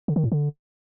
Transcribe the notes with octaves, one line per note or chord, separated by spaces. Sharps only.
D3
D#3
A2
D3